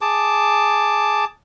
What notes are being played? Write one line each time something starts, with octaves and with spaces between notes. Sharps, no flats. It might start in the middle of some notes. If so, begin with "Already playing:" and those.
G#4 A5 D6